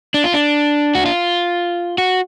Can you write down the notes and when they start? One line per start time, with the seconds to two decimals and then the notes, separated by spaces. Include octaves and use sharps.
0.14 D4
0.24 F4
0.34 D4
0.95 F#4
1.06 F4
1.98 F#4